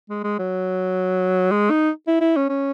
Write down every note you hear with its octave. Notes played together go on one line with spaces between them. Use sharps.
G#3
G#3
F#3
G#3
D#4
E4
E4
C#4
C#4